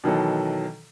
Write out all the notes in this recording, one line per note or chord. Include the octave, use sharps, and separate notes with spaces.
B2 D#3 E3 F#3 A4